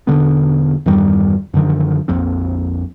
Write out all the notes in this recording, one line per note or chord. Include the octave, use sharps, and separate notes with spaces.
E1 F2 D3 B3
E2 G2 D#3 G3
F#2 D3 D#3 F3
A#1 F2 F3 C4